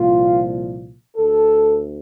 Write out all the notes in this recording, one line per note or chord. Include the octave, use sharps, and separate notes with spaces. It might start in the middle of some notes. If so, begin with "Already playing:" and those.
Already playing: C2 A#2 F3 F4
D2 A4